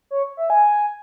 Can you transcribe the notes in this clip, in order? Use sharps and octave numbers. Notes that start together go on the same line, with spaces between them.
C#5
E5
G#5